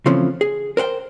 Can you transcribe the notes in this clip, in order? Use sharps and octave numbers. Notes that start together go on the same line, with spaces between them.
C#3 E3 F3 A3 C4 C#4
G#4
A#4 C5 F#5 G5